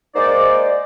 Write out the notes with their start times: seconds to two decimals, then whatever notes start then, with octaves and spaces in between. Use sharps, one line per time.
0.15 G#3 A#3 D#4 C5 D5